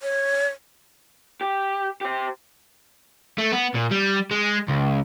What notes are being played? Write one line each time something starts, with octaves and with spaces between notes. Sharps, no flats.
C#5
G4
G4 C5
A3
B3
A#2
G3
G#3
C#2